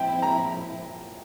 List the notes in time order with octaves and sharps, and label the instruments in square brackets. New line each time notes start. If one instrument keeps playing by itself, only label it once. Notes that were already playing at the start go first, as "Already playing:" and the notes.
Already playing: [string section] F3 C4 E4 [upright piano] G5
[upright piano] A#5